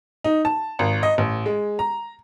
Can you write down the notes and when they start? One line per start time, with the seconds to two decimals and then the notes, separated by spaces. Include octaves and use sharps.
0.24 D#4
0.45 A5
0.79 G#1
1.03 D#5
1.18 A1
1.46 G#3
1.79 A#5